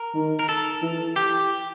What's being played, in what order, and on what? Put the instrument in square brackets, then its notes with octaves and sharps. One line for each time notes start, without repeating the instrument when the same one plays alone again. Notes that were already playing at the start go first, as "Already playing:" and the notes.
Already playing: [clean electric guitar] A#4
[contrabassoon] D#3
[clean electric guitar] A#4
A4
[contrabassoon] E3
[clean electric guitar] G4